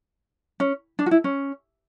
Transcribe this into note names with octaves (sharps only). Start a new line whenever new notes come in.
C#4
D4
F#4
E4
C#4